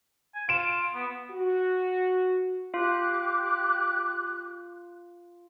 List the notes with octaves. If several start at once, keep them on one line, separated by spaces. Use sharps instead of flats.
G#5
F4 D7 E7
B3
F#4
F4 G4 F5 D6 F#6